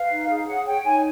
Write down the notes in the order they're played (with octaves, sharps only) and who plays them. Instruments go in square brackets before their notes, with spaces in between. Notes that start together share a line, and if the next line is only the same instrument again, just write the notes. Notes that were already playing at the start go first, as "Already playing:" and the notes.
Already playing: [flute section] B4 F5
D#4
G#4
C#5 F#5
C#5 G5
D#4 G#5